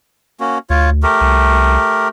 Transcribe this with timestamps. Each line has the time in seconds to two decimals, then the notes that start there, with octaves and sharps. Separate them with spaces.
0.40 A#3 C#4 F#4
0.70 D2 F4 C#5
1.03 A3 G4 A#4
1.21 C2